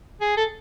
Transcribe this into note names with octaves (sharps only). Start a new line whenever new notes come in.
G#4
A4